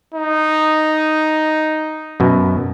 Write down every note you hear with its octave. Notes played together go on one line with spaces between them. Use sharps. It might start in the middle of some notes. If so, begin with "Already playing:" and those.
D#4
F#2 B2